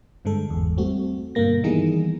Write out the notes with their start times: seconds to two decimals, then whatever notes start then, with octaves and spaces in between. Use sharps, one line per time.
0.25 G2 D3 G#3 A4
0.50 G#1 E2
0.77 G3 A3 C4 F#4
1.35 G2 B2 D3 A#3 A#6
1.64 D#3 E3 G3 B3 D#4 G#4